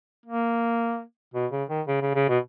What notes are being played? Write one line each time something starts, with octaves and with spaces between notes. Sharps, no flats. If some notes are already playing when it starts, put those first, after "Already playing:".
A#3
B2
C#3
D#3
C#3
C#3
C#3
B2